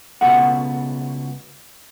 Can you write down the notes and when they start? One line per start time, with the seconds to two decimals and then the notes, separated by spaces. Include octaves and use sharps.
0.21 C#2 B2 A3 F#4 F#5